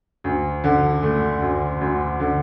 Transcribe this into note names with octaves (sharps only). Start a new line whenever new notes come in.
D2
D3
A3
D2
D2
D3